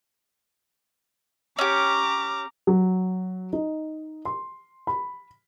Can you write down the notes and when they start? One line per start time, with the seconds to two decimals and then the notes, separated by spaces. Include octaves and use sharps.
1.59 C#4 G4 A#5 D6
2.67 F#3
3.53 D#4
4.25 C6
4.87 B5